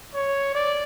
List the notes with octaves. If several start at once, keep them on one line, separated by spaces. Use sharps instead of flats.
C#5
D5